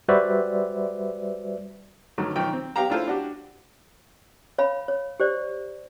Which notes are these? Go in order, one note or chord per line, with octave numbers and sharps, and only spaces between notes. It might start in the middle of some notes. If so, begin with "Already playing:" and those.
G3 F#4 B4 C5 D5 E5
G2 D3 D#3 F#3
B1 D#3 F3 G5
C4
B3 G4 F5 G5 A#5
D4 E4 F4 A4 C5
D4 F#4 G4
C#5 F5 B5
C#5
G4 C5 D5